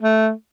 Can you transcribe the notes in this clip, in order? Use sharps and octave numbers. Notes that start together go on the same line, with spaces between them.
A3